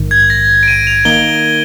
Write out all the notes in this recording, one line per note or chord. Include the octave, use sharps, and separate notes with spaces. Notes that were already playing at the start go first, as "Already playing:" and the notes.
Already playing: A#1 G#2 D#3
G#6
A#6
D7
D#7
F7
D#3 A#3 D#4 G7